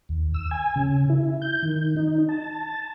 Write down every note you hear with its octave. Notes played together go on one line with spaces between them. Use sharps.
D#2
E6
G#5
C#3
E4
G6
D#3
D#4
A5